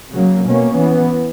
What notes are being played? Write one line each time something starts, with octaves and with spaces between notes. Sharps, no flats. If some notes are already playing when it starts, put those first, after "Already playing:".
C#3 F#3 A#3
B2 A#3 C#4
E3 B3